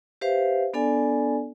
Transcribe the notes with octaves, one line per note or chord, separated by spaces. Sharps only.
G4 B4 C5 E5 F5
B3 D4 A4 D5 G#5